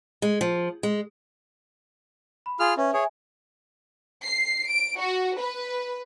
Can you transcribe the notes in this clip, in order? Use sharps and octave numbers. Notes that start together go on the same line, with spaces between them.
G#3
F3
G#3
B5
F4 G#4 F6
C#4 B4 E5
G#4 C#5 E5 G#5
C7
D7
F#4
B4